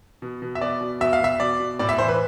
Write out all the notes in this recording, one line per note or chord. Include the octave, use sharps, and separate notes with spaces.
B2
B2
E5
B2 D5
B2
B2 E5
F5
B2 E5
B2 D5
B2
A2 D5
E5
E3 C5
B4